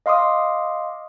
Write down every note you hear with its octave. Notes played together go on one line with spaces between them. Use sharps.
D#5 F5 C6 D6 D#6